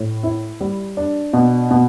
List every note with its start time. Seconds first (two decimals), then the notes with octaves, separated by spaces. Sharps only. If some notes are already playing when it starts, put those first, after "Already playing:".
Already playing: A2
0.23 E4
0.61 G3
0.97 D4
1.33 B2
1.71 B2